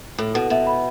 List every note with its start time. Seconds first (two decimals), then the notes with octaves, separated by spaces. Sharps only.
0.18 A2 A4
0.34 B2 A4
0.50 B2 E5
0.67 B5